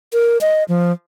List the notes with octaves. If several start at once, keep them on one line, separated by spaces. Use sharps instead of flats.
A#4
D#5
F3